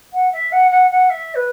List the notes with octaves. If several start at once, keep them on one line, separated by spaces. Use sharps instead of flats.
F#5
E5
F#5
F#5
F#5
E5
B4